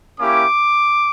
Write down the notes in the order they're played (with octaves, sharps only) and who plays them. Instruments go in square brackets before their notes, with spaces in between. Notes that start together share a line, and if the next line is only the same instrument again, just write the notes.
[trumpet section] A#3 C#4 E4 G4 D6